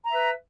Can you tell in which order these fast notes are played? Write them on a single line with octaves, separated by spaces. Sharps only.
A#5 E5 B4